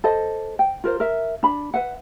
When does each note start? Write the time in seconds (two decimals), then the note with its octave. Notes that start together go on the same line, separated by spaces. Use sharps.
0.04 A4 C5 D#5
0.59 G5
0.84 F4 A#4 C5
1.00 A#4 E5
1.43 D4 B5
1.74 B4 E5 F#5